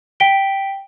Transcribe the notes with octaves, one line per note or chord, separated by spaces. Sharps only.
G5 B6 D7 G7